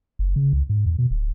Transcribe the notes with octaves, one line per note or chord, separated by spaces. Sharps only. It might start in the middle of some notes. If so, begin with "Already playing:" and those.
F#1
C#3
C#2
G#2
E2
B2
D1